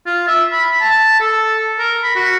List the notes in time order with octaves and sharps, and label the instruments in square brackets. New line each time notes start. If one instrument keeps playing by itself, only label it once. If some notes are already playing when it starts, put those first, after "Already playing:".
[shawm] F4
E5
B5
A5
A4
A#4
B5
F#4